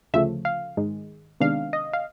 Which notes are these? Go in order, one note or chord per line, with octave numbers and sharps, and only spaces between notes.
D2 C#3 F3 A3 E5
F5
G#2 D#3 G#3
C3 D#3 G#3 B3 D4 F5
D#5
F5